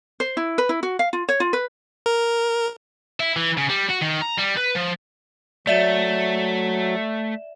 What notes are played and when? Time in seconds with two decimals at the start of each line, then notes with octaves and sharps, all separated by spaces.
0.20 C5
0.37 E4
0.58 B4
0.69 E4
0.83 F#4
0.99 F5
1.13 F4
1.29 C#5
1.40 F4
1.53 B4
2.06 A#4
3.20 E4
3.36 E3
3.57 C#3
3.70 G3
3.90 F#4
4.02 D#3
4.22 A#5
4.39 G3
4.58 B4
4.76 F3
5.67 F#3 A3 D5 E5 E7